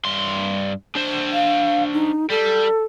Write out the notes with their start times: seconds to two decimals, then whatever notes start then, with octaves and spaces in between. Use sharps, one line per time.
0.05 G2 C6
0.96 D4 C5
1.32 F5
1.93 D#4
2.30 G3 A4